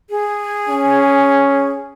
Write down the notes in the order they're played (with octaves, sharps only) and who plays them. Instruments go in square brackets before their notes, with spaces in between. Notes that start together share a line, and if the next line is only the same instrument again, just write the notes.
[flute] G#4
[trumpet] C#4